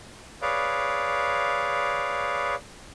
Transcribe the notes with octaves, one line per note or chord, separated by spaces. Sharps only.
G#4 B4 C#5 D5 F5